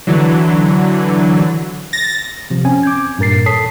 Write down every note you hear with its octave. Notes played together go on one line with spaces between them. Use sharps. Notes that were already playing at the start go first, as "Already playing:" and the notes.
D3 E3 F#3
A6 A#6
C3 F3
C4 C#4 G#5
D6 G6 G#6
G2 A#2 A#4 A6 C7
A4 C#5 A5 D#6 B6 C7